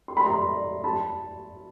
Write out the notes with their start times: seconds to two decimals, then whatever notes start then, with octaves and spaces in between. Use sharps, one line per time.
0.08 C6
0.17 B5
0.26 A#5 C6
0.84 A5 B5